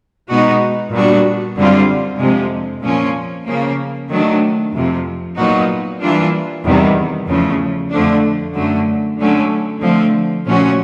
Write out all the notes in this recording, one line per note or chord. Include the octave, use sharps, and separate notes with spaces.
B2 G#3 B3 D#4 F#4
A#2 G3 B3 D4 F#4
F#2 D3 G3 C4 F4
F2 C3 F3 G#3
A#2 F3 A#3 C#4
C#3 F3 A#3
D#3 F#3 A3 D4
F2 C3 F3
A#2 F#3 B3 D#4 F#4
E3 G3 A#3 D4 F4
E2 C3 D#3 G3 B3
E2 C#3 F3 A3
F2 D3 F3 A3 D4
F#2 D3 F#3 A3
D3 F#3 A3 C#4
D3 F3 A3 C4
A#2 F3 A3 C#4 F#4